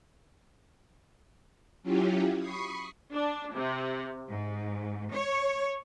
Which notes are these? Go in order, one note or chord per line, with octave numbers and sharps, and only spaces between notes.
F#3 C#4 E4 F4 G4
B5 C#6 D#6 C7
D4
C3
G#2
C#5